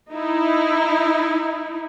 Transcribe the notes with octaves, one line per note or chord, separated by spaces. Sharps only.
D#4 E4